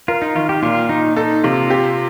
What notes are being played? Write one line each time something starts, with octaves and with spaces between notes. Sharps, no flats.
F4 A#4
D#4
D#3 F4
G4
A#2 F4
A#2 D#4
D#4 A4
C3 F4
G4